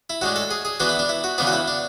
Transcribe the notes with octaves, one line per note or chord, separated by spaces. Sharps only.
E4
A2 G#3 D4 F#4
A4
G#4
G#4
E3 B3 D4 F#4
E4
D4
E4
F#4
C#3 E3 B3 D4
F#4
E4
D4